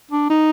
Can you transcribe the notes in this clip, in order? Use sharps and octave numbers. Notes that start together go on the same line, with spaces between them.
D4
D#4